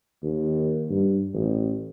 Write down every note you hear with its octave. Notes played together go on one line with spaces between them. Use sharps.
D#2
G2
A1